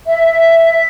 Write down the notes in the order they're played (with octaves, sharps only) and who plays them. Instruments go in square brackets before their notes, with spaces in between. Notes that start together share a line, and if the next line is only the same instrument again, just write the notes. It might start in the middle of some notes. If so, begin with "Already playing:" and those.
[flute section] E5